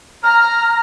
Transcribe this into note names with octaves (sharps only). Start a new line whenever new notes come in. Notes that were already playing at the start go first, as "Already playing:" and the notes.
A#5 F6